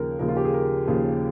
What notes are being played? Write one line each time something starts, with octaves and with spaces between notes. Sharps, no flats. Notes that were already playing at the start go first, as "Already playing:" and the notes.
Already playing: D#2 C#3 F3 A#4
D#2 C#3 F3 A#4
F4
G4
G#4
A#4
D#2 C#3 F3